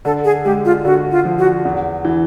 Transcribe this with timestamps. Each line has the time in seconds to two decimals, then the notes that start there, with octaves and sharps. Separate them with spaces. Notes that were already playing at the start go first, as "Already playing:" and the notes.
0.05 D3 A4
0.24 G#4
0.45 G#3 G4
0.65 F4
0.85 D3 F#4
1.11 F4
1.25 F3
1.38 F#4
1.65 E2
2.05 E3